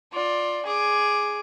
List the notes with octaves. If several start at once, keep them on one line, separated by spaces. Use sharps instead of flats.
F4 D5
G#4 D6